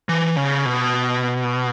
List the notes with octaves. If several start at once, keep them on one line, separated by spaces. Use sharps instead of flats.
E3
C#3
B2